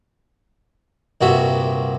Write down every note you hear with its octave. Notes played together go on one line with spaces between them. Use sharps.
C2 G2 A#2 F#4 E5